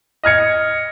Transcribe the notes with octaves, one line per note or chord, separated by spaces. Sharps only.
D#5 F6 G#6 C#7